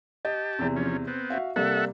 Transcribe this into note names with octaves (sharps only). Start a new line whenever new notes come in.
G4 D#5 A5
E2 C3
F3 C#4
B3 C4
F#4 E5 F5
C3 G3 A#3 A4 E5 F#5